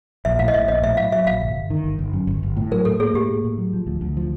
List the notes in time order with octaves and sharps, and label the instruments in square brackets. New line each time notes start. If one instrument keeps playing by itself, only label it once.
[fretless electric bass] A#1 [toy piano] E5
[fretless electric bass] A2 [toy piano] F5
[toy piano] D#5
[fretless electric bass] A#1 [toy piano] E5
[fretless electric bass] A#1 [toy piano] D#5
[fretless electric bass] A2 [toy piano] E5
[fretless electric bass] F#3 [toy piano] F5
[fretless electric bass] F#3 [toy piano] E5
[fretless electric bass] A#1 [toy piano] F5
[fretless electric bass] G1
G1
D#3
G1
G1
F#2
G1
G1
A2
[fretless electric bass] F#3 [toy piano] A#4
[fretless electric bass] A2 [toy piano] A4
[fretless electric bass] A#3 [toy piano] G#4
[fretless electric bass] A2 [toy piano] G4
[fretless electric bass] A#3
A2
F#3
F3
D2
D2
F3